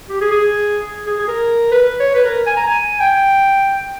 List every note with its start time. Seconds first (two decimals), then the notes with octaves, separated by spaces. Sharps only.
0.09 G4
0.21 G#4
0.31 G#4
1.06 G#4
1.19 G#4
1.28 A#4
1.71 B4
2.00 C#5
2.15 B4
2.25 A#4
2.46 G#5
2.56 A#5
2.66 G#5
3.00 G5